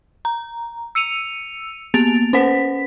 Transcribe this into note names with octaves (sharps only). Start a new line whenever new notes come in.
A#5
E6 C#7 D#7 F7
A#3 B3 A6 D7 F7
C#4 B4 C5 F#5 B6